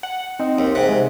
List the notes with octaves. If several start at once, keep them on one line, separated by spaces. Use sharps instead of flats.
F#5
C4 D#4
D#2
G#2 C3 F#6
G#3